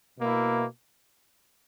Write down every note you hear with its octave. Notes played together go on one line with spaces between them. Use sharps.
B2 A#3 E4